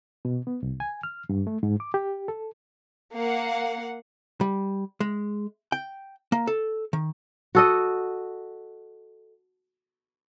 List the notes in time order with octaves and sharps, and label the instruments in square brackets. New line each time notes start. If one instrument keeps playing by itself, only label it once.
[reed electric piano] B2
B3
C2
G#5
F6
G2
A3
G#2
D6
G4
A4
[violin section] A#3 F5 F#5
[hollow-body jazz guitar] G3
G#3
G5
A#3
A4
D#3
[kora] F#4 A4 D#5